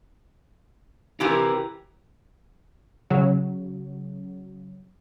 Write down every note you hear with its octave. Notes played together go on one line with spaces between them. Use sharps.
C3 E3 E4 G4 A#4
C#3 F#3